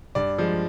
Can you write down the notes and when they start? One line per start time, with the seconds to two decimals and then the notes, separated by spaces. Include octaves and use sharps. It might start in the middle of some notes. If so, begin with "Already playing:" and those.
0.15 G2 D5
0.38 F3 G#3